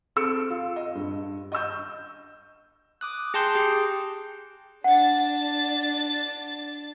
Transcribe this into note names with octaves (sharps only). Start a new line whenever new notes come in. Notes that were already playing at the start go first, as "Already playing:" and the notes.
C4 A4 E6 C#7 D7
F4
D#5
G2
D#5 C#6 E6 G6
D6 D#6 F#6
G#4 G5 A5 C6 G6 C7
G4 G#4 G5
D4 F#5 A6